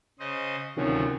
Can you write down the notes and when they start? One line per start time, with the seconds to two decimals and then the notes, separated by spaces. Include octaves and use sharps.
0.19 C#3 C5 D#5
0.77 D2 C3 D#3 F3 F#3 C#4